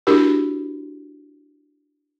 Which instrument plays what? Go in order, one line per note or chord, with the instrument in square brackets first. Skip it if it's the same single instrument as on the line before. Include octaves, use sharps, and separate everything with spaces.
[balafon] D4 E4 F#4 G4 A#4